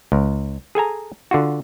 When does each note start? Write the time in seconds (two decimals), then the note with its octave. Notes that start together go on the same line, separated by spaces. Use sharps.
0.12 C#2
0.75 G#4 A4 G#5 A#5
1.31 D3 F4 F#4